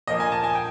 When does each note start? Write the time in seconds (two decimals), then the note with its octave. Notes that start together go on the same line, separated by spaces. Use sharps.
0.07 A#2 F3 A#3 D#5
0.20 G#5
0.32 A5
0.44 G#5
0.55 G5